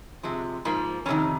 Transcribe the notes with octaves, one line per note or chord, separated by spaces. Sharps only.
C3 F3 G#3
G#2 F3 A#3
F2 C3 D#3 C#4